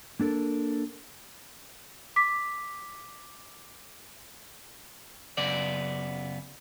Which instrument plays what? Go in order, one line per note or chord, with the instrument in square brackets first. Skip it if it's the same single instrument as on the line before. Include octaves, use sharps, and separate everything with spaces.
[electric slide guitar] A#3 D4 A4 A#4
[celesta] D6 B6
[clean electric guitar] F#2 C#3 B3 D5